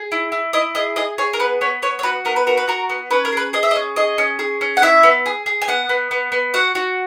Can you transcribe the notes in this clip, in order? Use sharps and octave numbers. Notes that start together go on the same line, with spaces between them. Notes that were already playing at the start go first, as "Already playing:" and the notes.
Already playing: G#4
E4
E4
E4 D#5
G#4 D#5
G#4 D#5
G#4 C#5
A#4
B3 B4
B3 C#5
B3 C#5
C#5
F#4 B4
B3 A#4
B4
F#4 A#4
B4
F#4 A#4
B3
C#4 B4
A#4
G#4 B4
G#4 D#5
E5
D#5
C#4
G#4 D#5
C#4
G#4
C#4
F#5
E4 E5
B3
G#4
G#4
G#5
B3 F#5
B3
B3
B3
F#4 F#5
F#4